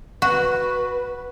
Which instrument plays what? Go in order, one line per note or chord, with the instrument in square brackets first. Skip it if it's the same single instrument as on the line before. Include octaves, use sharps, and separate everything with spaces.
[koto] F#4 [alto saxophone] B4